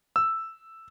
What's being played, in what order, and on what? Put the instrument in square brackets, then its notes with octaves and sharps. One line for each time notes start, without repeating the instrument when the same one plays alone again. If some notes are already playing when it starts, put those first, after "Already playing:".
[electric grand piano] E6